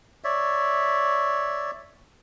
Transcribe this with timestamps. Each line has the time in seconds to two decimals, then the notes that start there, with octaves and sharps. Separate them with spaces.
0.24 C#5 D5 E5